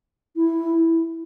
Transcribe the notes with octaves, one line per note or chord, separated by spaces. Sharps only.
E4